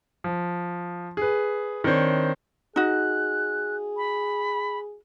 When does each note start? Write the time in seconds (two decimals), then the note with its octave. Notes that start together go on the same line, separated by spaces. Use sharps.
0.24 F3
1.17 G#4 B4
1.84 D#3 C4 D4 C5 C#5
2.76 D#4 F#4 G#4 F#6
3.97 B5